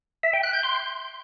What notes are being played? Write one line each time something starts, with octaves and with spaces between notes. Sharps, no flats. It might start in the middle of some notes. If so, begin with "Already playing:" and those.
E5
G5
F#6
G6
C6